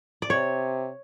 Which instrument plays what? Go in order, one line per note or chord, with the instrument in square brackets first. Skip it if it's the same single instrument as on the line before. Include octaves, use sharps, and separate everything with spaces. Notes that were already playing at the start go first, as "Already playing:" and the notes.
[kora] D5
[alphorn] C3 [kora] C#5